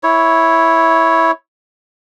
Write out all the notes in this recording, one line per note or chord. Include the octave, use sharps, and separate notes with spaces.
E4 C#5